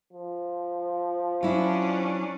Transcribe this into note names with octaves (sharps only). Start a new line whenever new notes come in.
F3
F#3 C#4 D4 E4